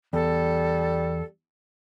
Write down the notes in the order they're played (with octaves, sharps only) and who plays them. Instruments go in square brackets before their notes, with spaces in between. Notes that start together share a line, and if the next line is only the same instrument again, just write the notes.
[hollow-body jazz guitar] E2 [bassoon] G3 [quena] A4